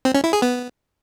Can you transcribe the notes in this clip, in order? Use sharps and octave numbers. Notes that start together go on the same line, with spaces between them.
C4
C#4
E4
G#4
B3